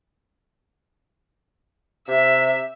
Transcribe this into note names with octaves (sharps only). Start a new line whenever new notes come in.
C3 E5